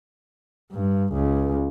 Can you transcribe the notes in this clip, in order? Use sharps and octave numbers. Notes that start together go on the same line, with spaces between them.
G2
C#2